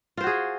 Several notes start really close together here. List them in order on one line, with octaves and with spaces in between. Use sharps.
F4 C5 F#4 G#4